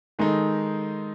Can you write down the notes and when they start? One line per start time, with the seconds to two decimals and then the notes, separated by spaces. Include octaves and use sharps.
0.19 D#3 G#3 D#4 A4